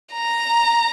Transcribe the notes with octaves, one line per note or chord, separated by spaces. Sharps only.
A#5